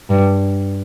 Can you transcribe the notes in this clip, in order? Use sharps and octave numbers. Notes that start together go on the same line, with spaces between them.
G2